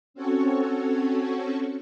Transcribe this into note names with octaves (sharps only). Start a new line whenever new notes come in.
C4 C#4 F#4 A4 C#5